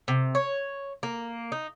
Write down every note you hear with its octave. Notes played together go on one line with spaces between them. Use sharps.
C3
C#5
A#3
D#4